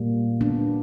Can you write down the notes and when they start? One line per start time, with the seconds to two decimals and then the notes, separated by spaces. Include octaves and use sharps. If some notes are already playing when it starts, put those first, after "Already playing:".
Already playing: A#2 G3 A#3
0.41 B3 D4